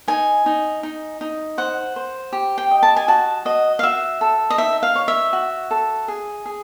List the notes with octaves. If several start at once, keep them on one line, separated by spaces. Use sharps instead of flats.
D#4 G#5
D#4
D#4
D#4
C5 F#5
C5
G4
G5
D#5
A5
G#5
F#4 A5
F#4 D#5
F5
F#4 E5
A4
D#5
D#4 E5
F5
C#5
E5
F#4
A4
G#4
G#4